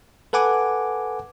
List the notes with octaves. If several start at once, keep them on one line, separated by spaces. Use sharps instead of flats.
A4 B4 F#5 G#5 D6